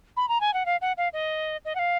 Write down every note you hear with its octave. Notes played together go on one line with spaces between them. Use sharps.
B5
A#5
G#5
F#5
F5
F#5
F5
D#5
D#5
F#5
F5